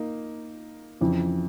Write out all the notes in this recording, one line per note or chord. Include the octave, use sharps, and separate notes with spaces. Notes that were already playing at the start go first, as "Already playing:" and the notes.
Already playing: A#3 D#4
F2 C#3 E3